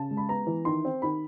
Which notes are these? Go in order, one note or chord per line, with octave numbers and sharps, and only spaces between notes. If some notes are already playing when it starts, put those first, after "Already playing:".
Already playing: C#3 A5
G#3
B5
B3 A#5
E3
D#3 C6
C4
D#3 B5